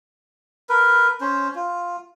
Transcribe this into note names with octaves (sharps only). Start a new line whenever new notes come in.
A#4 B4
C#4 C5
F4